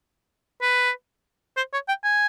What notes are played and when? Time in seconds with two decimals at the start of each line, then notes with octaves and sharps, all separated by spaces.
0.62 B4
1.57 C5
1.73 C#5
1.88 G5
2.04 G#5